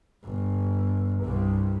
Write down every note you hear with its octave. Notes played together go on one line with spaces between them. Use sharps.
G1
C2 G2